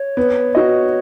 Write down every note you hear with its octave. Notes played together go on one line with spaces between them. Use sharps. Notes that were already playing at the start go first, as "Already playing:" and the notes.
Already playing: C#5
B3
F#4 D#5